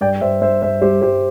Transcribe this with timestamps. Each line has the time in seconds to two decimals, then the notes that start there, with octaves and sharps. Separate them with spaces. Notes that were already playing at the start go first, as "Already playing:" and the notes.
0.01 G2 D5 G5
0.21 G2 C5 E5
0.41 G2 C5 E5
0.62 G2 C5 E5
0.81 G3 G4 C5
1.01 G2 G4 C5